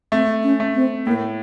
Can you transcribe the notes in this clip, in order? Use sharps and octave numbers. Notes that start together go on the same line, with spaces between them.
A3 C4
C#4
A3
C4
A2 A#3